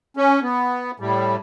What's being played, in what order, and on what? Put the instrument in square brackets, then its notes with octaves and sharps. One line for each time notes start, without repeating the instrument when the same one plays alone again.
[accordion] C#4
B3
A2 G3